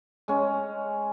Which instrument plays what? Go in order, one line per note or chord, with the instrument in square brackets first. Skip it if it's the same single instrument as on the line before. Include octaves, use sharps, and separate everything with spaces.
[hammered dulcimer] G#3 C#4